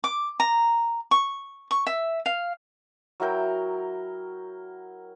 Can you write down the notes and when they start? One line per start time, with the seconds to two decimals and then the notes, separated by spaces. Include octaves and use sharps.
0.04 D6
0.40 A#5
1.11 C#6
1.71 C#6
1.87 E5
2.26 F5
3.20 F#3 E4 A#4 G5